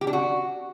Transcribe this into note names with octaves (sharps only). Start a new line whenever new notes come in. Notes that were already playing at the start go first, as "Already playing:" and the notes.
G4
D4
F#4